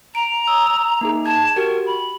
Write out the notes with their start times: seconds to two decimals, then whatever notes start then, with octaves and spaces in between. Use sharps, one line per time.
0.15 A#5 D7
0.48 D#6 E6
1.01 A#3 D#4 G#4
1.26 A5 G#6
1.56 F#4 G4 A#4
1.86 B5